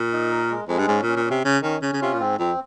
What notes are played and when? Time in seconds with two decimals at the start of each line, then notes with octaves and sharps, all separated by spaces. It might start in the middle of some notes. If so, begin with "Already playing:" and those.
Already playing: A#2
0.13 D#4
0.31 A#4
0.50 G#3
0.68 F2 G#3
0.78 G2
0.87 G#2 C#4
1.02 A#2 C#4
1.16 A#2
1.25 C#4
1.30 C3
1.44 C#3 C#4
1.63 D#3 C#4
1.82 C#3 C#4
1.93 C#3
2.02 C3 F4
2.14 A#2
2.20 G#2 C4
2.39 F2 C4